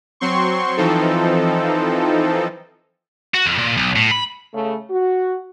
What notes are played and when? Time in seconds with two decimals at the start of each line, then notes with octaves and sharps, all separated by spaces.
0.20 F#3 C4 C6 C#6
0.77 E3 F3 C4 D#4 A4
3.35 F#4
3.46 F2
3.58 A#2
3.77 B1
3.96 A2
4.11 B5
4.53 C#3 A3
4.89 F#4